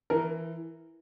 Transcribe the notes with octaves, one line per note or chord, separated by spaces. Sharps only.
E3 A#4